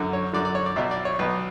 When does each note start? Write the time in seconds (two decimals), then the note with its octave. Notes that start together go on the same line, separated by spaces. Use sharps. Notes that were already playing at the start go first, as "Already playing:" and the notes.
Already playing: F#2 D3
0.13 C#5
0.33 F#2 D3 D5
0.45 D5
0.55 C#5
0.66 D5
0.76 B1 B2 E5
0.91 D5
1.05 C#5
1.19 B1 B2 B4